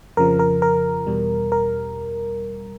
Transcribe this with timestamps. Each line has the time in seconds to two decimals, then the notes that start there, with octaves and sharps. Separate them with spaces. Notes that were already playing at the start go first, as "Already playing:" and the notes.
0.17 F2 C#3 F3 A#4
0.39 A#4
0.62 A#4
1.07 E2 B2 G3
1.52 A#4